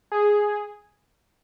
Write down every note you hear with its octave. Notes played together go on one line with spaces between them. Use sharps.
G#4